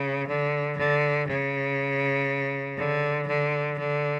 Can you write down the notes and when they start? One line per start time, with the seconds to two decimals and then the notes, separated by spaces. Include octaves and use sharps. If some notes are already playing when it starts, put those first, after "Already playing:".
Already playing: C#3
0.28 D3
0.78 D3
1.28 C#3
2.77 D3
3.27 D3
3.78 D3